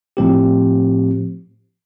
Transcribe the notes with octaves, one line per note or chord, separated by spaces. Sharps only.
A2 F3 C4 G4